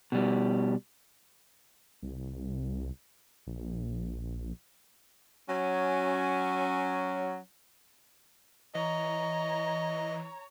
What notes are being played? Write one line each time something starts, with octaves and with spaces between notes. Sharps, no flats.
B2 G3
C2
A#1
F#3 C#4
E3 C#5 D#5 A#5